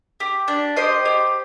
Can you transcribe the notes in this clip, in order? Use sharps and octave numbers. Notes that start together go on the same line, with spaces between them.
G4
D4
G4 C5 D#5
G4